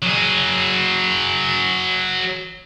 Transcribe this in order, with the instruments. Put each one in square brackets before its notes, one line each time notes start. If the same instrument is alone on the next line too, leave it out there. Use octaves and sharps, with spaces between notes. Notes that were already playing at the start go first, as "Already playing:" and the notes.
[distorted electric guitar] F#3 G#4